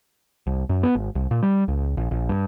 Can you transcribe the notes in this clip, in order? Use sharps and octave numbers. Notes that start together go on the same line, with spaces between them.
C2
F#2
B3
G#1
C2
A#2
G3
C#2
A#1
A#1
G2